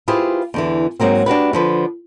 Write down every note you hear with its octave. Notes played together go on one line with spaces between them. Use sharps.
E4 F4 G4 G#4 B4 C5
E2 D3 E3
G#2 F#3 A#3 C4
D4 F#4 G4 B4
D3 F3 B4